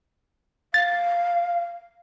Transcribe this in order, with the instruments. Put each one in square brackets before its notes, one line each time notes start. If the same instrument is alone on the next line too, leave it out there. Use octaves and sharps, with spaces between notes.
[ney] F5 [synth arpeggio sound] A6